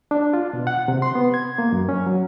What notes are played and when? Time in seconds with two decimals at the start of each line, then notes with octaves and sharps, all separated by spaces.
0.11 D4
0.33 F4
0.53 B2
0.67 F#5
0.88 C3
1.02 C6
1.15 B3
1.34 G#6
1.58 A#3
1.72 F#2
1.89 C#4
2.06 F#3